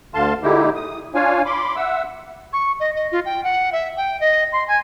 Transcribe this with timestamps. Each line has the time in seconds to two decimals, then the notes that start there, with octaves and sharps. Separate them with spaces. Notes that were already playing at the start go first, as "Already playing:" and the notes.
0.14 D2 D3 F5 A5 C6
0.43 A#2 D3 G#3 D#4 E4 G4
0.75 D#6
1.15 D4 F4 C#5 F5 G#5
1.45 B5 C6 D6
1.76 E5 F#5 E6
2.53 C#6
2.80 D#5
2.96 D#5
3.12 F4
3.25 G5
3.44 F#5
3.73 E5
3.97 G5
4.20 D#5
4.53 C6
4.68 G#5